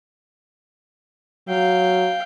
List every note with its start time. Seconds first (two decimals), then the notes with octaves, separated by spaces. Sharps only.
1.48 F#3 F5 G5